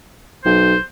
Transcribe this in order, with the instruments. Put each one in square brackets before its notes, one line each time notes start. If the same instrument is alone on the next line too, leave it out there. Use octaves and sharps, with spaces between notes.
[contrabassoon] B1 [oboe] C5